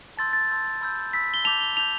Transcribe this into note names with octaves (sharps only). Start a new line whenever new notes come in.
A5 C6 E6 G6 A6
A6
A5 C6 E6 G6
B5 E6 G6
B5 E6 G6 B6
G7
A5 D6 G6 F7
G7
A5 D6 G6 F7